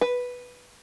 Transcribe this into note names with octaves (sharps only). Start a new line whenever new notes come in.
B4